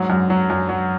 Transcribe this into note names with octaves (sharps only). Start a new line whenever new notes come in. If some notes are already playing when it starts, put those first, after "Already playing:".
Already playing: G#2 F#3
F#2
F#3
F#2
F#3